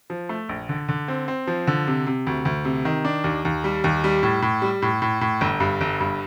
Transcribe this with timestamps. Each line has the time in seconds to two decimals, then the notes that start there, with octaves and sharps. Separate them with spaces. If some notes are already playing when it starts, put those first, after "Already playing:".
0.10 F3
0.29 A3
0.49 A#1
0.69 D3
0.89 D3
1.08 C4
1.28 C4
1.47 F3
1.67 D3
1.87 C3
2.07 C3
2.27 D2
2.45 D2
2.65 C3
2.85 D#3
3.05 D4
3.24 D#2
3.45 D#2
3.64 G3
3.84 D#2
4.04 G3
4.23 A2
4.42 A2
4.62 G3
4.82 A2
5.02 A2
5.21 A2
5.41 G1
5.60 G2
5.81 G1
6.00 G2